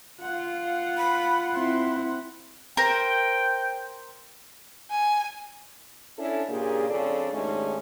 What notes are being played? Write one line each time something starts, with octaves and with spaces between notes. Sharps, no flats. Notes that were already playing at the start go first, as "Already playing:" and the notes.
F4 F#5
B5
C4 E4 C6
A#4 C5 G5
G#5
C#4 D4 E4 A4
A#2 C#3 A#3 D4 G4 G#4
F2 C#3 D4 A4 D5
D#2 G#2 G#3 A3 C#4 D4